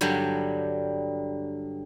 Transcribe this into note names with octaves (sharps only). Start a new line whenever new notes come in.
G2 D3 F#3 G3